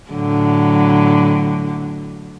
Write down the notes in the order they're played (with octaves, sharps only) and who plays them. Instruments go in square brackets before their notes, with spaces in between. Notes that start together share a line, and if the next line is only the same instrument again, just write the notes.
[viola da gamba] A2 D3 F#3